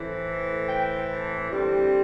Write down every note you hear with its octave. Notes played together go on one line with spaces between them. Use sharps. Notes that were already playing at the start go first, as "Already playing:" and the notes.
Already playing: A2 E3 A3 C4
G5
A5
D3 G3 C4